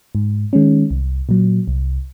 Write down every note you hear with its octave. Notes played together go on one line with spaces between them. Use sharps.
G#2
D#3 G#3 C#4
C2
A#2 F#3
C2